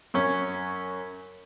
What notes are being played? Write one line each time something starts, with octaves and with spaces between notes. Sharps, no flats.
F#2 C#4